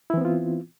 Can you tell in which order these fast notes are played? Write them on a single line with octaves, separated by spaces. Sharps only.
E4 E3 C4 B3 F4